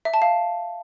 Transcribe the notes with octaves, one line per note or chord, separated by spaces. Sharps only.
E5
A5
F5